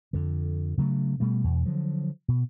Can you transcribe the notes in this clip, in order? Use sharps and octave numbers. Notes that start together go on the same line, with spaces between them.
F2 D3
C#3 F#3 G#3 A3
B2 G3 A3
E2 B2
D3 F3 F#3
B2